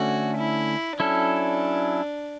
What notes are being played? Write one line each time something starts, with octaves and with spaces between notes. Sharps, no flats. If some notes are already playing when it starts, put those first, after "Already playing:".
Already playing: D3 A3 C#4 F#4
E4
F#3 C#4 D4 E4 A4